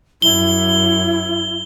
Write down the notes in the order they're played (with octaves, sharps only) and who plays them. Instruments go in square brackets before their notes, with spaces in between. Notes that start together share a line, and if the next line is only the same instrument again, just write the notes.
[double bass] F#2 [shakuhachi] E4 [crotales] G7